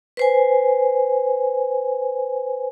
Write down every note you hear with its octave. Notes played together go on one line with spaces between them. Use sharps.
B4 C5 G#5